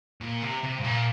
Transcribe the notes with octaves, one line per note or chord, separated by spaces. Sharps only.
A#2
C3
C3
G2
A#2